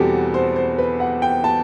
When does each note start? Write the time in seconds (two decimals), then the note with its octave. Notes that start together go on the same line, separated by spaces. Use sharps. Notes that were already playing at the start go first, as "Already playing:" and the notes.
Already playing: E2 B2 G3 C4 F#4 G4 A4
0.34 C5
0.56 C5
0.78 B4
1.00 F#5
1.22 G5
1.44 A5